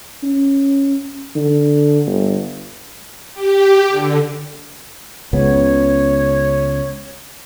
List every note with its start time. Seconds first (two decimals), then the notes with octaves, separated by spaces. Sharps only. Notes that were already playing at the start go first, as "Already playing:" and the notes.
0.23 C#4
1.35 D3
2.06 G1
3.34 G4
3.89 D3
5.33 C#2 C#3 B3 C#5